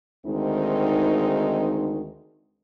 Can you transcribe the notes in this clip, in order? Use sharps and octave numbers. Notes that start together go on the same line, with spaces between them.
D2 D#3 G#3 C4 D#4